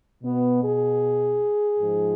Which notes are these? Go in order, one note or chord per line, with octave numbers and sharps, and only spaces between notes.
B2 B3
G#4
G#2 F3